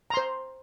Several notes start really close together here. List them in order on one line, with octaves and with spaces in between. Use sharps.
A#5 C6 C5